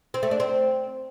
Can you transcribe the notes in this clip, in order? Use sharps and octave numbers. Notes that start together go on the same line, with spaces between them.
C4
A3
D4
C4